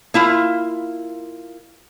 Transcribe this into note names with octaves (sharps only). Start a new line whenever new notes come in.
A#3 E4 F4